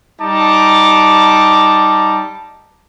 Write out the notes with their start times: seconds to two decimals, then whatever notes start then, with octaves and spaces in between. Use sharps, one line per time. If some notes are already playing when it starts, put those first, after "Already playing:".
0.20 G3 D#4 A5 D6